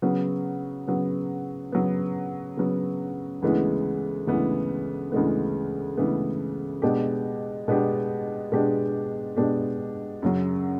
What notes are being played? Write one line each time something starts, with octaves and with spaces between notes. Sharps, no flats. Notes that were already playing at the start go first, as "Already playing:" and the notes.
C#3 F#3 B3
C#3 F#3 B3
C#3 F#3 B3
C#3 F#3 B3
D2 C#3 E3 G#3 B3
D2 C#3 E3 G#3 B3
D2 C#3 E3 G#3 B3
D2 C#3 E3 G#3 B3
B2 G#3 B3 D4 G4
B2 G#3 B3 D4 G4
B2 G#3 B3 D4 G4
B2 G#3 B3 D4 G4
F#2 C#3 F#3